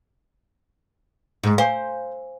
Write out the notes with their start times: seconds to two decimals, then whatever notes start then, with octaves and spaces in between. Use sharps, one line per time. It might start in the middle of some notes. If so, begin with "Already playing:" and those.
1.43 G#2
1.58 C5 F5 G#5